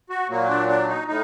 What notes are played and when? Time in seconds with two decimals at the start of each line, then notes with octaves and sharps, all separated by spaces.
0.10 F#4
0.29 A#2 F#3 A#3
0.49 D4
0.69 D4
0.88 D#4
1.08 A2 D#4